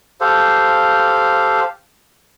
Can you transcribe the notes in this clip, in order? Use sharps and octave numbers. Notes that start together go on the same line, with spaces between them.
G4 A4 C5 F5